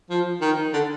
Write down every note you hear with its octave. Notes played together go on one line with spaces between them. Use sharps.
F3
D#3
D3